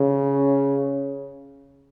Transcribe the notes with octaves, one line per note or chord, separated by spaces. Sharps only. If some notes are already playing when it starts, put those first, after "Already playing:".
Already playing: C#3